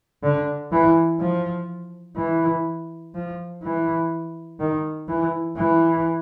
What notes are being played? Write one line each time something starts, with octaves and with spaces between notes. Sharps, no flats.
D3
E3
F3
E3
F3
E3
D#3
E3
E3